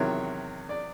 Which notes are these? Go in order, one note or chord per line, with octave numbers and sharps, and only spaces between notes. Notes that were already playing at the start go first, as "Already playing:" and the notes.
Already playing: E2 C3 D#3 F#3 C#5
D5